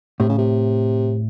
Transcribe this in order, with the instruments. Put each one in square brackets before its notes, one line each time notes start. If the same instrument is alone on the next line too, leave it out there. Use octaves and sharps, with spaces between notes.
[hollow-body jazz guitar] A2 [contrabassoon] C3
[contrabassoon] C#3
C3